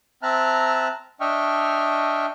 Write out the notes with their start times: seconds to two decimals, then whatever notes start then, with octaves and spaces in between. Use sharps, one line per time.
0.23 C4 E5 A5 A#5 F6 F#6
1.21 D4 D#5 E5 G5 C#6 F6